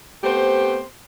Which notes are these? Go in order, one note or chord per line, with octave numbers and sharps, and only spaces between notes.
A3 B3 C4 G4 C5